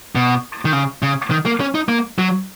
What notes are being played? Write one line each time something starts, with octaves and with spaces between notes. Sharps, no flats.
B2
D#3
C#3
C#3
D#3
A#3
C#4
D#4
A#3
F#3